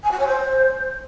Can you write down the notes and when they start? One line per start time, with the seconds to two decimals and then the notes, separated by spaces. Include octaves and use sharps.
0.03 G#5
0.11 F#4
0.19 C#5
0.26 C5